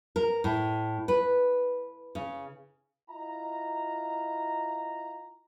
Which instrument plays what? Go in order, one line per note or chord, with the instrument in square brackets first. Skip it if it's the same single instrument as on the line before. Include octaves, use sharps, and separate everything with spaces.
[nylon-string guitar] A#4
A2
B4
C#3
[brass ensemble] E4 F4 D#5 A#5